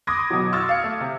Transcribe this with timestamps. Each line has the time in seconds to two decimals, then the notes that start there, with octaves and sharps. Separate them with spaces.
0.07 B5 C6 D6 D#6 G#6 A#6
0.30 B2 F#3
0.52 C6 C#6 E6 F6 G#6 A6
0.69 F5 C#7
0.84 A3
1.00 C3